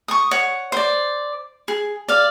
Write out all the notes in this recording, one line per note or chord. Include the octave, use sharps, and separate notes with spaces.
C#6 D#6
C#5 F#5
C5 D5
G#4
D5 F5